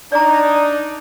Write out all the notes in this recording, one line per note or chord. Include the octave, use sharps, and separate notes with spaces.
D4 D#4 D5 A#5